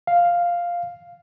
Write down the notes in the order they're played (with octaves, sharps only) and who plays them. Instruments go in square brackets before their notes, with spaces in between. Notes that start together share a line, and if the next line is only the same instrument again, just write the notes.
[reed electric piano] F5